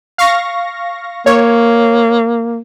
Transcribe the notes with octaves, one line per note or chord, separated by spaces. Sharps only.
F5 C#6 A#6
A#3 C#5